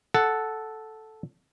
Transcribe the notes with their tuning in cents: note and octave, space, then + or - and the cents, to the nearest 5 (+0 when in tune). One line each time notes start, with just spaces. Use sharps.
A4 -5 F#5 +0